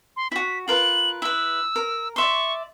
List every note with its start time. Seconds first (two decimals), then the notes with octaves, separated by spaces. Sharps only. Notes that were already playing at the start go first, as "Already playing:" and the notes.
0.17 C6
0.32 E4 F#4 B6
0.68 F4 A#4 B4 F#7
1.22 E4 B4 E6
1.76 A#4
2.16 D5 E5 C6 C#6